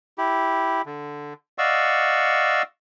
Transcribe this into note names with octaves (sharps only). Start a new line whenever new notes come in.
E4 G4
D3
D5 D#5 F5 F#5 C#6 E6